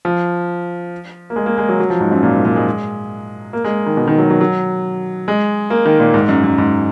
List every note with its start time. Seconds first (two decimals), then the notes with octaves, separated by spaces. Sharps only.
0.05 F3
1.30 A#3
1.36 G#3
1.46 A#3
1.58 G#3
1.69 F#3
1.80 F#3
1.90 F3
2.00 G#2
2.11 F#2
2.23 A#2
2.33 G#2
2.45 A#2
2.56 G#3
3.53 A#3
3.64 G#3
3.86 D#3
3.97 B2
4.07 D#3
4.18 F#3
4.30 F#3
4.41 F#3
5.28 G#3
5.70 A#3
5.85 D#3
6.00 A#2
6.14 G#2
6.29 F#2
6.44 F#2
6.58 G#2